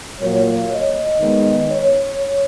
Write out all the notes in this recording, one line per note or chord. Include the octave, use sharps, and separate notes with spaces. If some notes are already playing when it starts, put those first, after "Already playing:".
A#2 F#3 A#3 C#5
D#5
D#3 G#3 B3
C#5